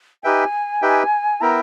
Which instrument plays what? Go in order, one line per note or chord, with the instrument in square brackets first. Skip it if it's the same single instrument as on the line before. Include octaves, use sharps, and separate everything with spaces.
[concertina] D#4 G4 B4 E5 G5 [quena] G#5
[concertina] D#4 G4 B4 E5 G5
[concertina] B3 E4 A#4 E5 G5 [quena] A#5